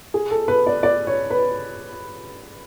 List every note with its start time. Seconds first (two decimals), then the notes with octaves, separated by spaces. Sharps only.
0.14 G#4
0.31 A4
0.48 B4
0.67 D5
0.83 D5
1.07 C#5
1.30 B4